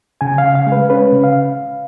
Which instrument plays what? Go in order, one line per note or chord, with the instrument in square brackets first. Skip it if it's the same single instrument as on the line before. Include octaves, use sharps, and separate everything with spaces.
[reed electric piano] C#3 G#5
F5
C#3
F5
G#3
B4
C#4 B4
C#3
F5